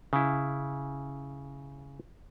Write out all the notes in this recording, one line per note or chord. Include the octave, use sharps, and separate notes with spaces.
C#3 E4